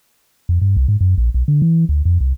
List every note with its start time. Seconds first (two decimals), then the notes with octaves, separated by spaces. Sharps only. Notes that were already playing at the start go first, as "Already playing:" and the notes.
0.49 F2
0.62 G2
0.77 C2
0.88 G#2
1.01 F#2
1.18 A#1
1.34 B1
1.48 D3
1.62 E3
1.89 D2
2.05 F2
2.21 C2